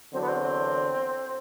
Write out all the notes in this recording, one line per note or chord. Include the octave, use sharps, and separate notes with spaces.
E2 D3 F#3 C4
B3
C4